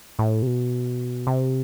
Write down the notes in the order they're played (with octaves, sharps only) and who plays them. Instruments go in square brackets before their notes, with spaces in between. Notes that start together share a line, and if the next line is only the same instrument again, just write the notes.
[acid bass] A2
C3
B2
C3